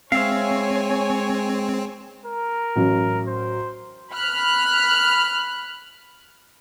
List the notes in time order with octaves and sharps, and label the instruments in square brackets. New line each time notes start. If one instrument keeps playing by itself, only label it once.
[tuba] G#3 [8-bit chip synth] C4 [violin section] C#5 G#5 [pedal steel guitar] E5 F5
[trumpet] A#4
[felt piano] A1 F#3
[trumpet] C5
[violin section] B5 F6 F#6